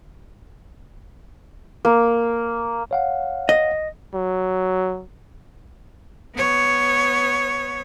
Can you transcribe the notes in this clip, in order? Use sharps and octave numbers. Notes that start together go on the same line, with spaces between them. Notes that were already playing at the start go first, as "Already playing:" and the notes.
A#3
C#5 F5 F#5
D#5
F#3
B3 C#5